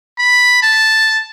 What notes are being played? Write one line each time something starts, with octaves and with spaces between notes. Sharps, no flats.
B5
A5